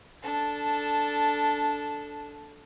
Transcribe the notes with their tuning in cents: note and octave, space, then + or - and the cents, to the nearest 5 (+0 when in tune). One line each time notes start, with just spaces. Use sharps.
D4 -10 A4 +0